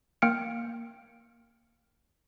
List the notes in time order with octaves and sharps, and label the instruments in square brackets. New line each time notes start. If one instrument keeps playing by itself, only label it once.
[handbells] A#3 G5 F6 C#7 D7